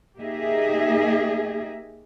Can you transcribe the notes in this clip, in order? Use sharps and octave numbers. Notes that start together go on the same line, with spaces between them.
A#3 D#4 G4 G#4 D#5 E5